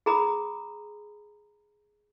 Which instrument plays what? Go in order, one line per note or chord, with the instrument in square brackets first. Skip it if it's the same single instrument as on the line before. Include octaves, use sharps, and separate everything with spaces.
[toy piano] G#4 A#5 B5 D#6